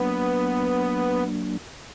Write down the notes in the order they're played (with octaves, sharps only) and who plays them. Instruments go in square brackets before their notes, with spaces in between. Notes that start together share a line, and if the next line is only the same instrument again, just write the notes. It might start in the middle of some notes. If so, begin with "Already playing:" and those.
Already playing: [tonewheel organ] F#3 A#3 D4 [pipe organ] B3